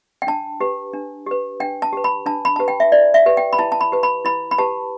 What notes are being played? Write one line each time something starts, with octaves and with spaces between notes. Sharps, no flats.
G5
D4 A5
G4 B4
D4
G4 B4
D4 G5
A5
G4 B4
B5
D4 A5
B5
G4 B4 A5
G5
E5
E4 D5
E5
G4 B4
G5
B5
E4 A5
A5
B5
G4 B4
B5
E4 B5
B5
G4 B4 A5